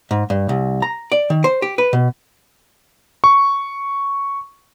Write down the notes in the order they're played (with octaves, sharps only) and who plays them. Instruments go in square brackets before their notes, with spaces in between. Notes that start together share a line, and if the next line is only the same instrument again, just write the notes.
[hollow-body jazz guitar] G#2
G2
C2
A#5
D5
D#3
C5
G4
B4
B2
[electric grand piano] C#6